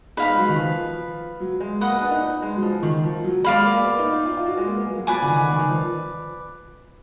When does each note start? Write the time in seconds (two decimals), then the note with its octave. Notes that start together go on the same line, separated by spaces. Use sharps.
0.17 D#4 B4 F5 B5
0.28 G#3
0.38 F#3
0.49 D#3
0.59 F3
1.40 F#3
1.60 G#3
1.81 A#3 B4 D#5 F#5
1.91 B3
2.02 D4
2.11 D#4
2.22 D#4
2.42 G#3
2.57 F#3
2.63 F3
2.83 D#3
3.04 F3
3.24 F#3
3.44 G#3 D5 F5 B5
3.64 A#3
3.85 B3
3.99 D#4
4.12 D#4
4.26 F4
4.37 F4
4.46 F#4
4.58 G#3
4.66 A#3
4.77 B3
4.87 F#3
4.97 F#3
5.07 F3 B4 D5 G#5
5.22 D3
5.28 D#3
5.49 D#3
5.59 D#3
5.69 F3